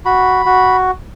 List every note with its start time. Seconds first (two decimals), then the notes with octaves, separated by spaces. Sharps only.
0.05 F#4 B5
0.46 F#4